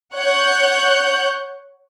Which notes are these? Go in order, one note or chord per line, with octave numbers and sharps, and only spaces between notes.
C#5 F#5 F#6 G6